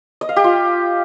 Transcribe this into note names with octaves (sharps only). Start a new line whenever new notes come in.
D#5
F5
G4
F4